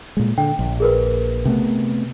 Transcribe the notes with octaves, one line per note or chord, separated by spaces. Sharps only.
A#2 G#3
D3 G5
A#1
G#4 A#4 B4
C3 A3 B3